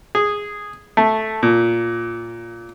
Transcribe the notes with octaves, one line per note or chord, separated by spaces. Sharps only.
G#4
A3
A#2